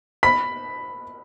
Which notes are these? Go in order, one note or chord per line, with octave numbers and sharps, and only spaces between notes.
B5 B6